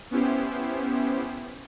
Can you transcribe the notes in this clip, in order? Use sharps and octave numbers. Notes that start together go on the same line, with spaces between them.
B3 C#4 E4 G4 C5